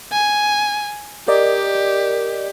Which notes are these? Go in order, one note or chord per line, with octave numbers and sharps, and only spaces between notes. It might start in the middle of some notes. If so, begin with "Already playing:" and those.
G#5
G4 A#4 D5 D#5